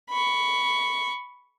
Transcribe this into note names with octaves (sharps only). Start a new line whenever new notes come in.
B5 C#6